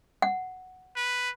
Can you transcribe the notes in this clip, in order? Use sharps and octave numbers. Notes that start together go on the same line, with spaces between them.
F#5
B4